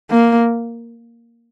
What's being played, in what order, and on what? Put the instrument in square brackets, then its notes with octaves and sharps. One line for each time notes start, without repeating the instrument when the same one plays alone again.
[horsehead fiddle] A#3